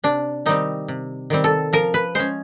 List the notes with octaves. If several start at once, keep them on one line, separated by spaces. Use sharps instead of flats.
C3 D4
D#3 G3 C4 D#4
C3
D#3 G3 C4
A4
F3 A#4
B4
G#3 C#4 C5